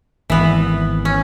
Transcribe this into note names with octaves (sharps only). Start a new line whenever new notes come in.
G#1 E3 B3
C#4